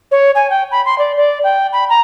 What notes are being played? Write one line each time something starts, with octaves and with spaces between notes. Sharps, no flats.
C#5
G#5
G5
B5
C6
D5
D5
G5
B5
A#5